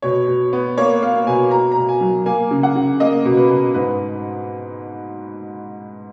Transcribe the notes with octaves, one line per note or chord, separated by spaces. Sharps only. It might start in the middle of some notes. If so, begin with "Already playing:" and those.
B2 C#5
B2
B3
A#3 C#5
A#3 F5
B2 G#5
B2 A#5
A#5
B2
G#5
F#3
A#3 G#5
C#3
F#5
C#3
A#3 D#5
B2
B4
B2
G#2 B4